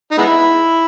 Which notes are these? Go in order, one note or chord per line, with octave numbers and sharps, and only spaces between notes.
D#4
G#3 B3 E4